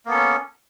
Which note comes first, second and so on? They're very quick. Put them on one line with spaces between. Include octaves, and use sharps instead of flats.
A#3 B3 A4 C#4